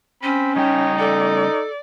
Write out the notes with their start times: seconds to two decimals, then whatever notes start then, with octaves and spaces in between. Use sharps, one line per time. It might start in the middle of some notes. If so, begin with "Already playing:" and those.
0.23 C4 C#4 B5
0.56 C#3 G3 D#4 C#5 G5
0.99 A4 D5